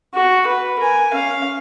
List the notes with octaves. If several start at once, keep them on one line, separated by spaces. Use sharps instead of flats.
F#4
B4
A#4 G#5
C#4 F5